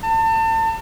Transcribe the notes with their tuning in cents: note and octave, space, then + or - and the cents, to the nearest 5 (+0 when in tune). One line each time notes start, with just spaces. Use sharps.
A5 +35